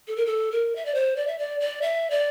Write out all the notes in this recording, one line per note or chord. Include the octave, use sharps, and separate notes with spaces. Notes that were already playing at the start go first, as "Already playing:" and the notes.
A4
A#4
A4
A#4
E5
D5
C5
D5
E5
D5
D5
E5
D5